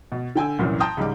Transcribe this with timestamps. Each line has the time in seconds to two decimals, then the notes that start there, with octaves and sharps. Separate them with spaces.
0.12 B2
0.35 D3 G5 G#5 E6
0.59 C2 F#2 A#2 E3
0.80 G5 A5 A#5 C6 D#6 G6
0.97 C#2 G#2 G3 D6